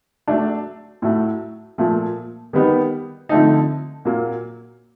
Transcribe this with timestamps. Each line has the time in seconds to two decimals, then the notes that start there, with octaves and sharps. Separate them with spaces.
0.28 F#3 A3 D4
1.02 A2 F#3 A3
1.78 A#2 F3 A3
2.53 D#3 G3 B3 D#4
3.29 D3 F3 A3 C4 D#4
4.05 A#2 F#3 A#3